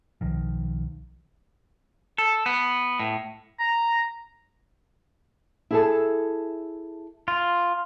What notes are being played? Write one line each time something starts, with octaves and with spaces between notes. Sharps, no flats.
B1 D#3 F3
A4
B3
A2
A#5
E4 G#4 A4
F4